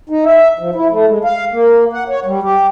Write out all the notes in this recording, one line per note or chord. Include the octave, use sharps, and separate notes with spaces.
D#4
E5
F3
E4
A3
G#3
F5
A#3
F#5
C#5
G3
G4